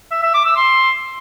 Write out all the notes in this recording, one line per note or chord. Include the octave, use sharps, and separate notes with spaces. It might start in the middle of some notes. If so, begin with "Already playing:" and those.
E5
E5
D6
E6
C6